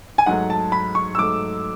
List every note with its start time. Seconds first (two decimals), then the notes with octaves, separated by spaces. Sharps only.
0.18 G#5
0.26 G#2 F#3 A3 F#5
0.50 A5
0.72 B5
0.95 C#6
1.15 E6
1.18 G#2 F#3 A3 D6